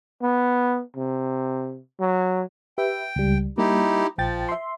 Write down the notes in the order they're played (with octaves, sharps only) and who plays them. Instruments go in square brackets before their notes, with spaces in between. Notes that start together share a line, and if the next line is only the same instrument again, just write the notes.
[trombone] B3
C3
F#3
[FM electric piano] G4 B4 E5 [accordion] G5
[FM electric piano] C#2 G3
[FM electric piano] G3 A#3 [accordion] D#4 E4 G4
[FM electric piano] A#1 G5 A6 [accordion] F3
[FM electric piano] E5 C6